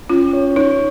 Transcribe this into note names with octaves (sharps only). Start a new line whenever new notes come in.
C#4 F4
C#5
D#4 C#5